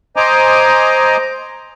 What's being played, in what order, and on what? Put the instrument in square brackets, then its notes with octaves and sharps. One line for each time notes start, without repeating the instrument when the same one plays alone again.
[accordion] C5 D#5 G#5 A#5 D6